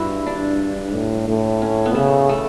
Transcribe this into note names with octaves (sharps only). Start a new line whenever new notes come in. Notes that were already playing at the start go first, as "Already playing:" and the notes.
Already playing: G2 E4 F#4
D4
A2
A2
C#4
B3
C#3 A3
A3